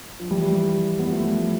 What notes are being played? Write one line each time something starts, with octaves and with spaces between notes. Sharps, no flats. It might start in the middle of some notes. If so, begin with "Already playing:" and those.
F3
E3 G3
B3
F3 A3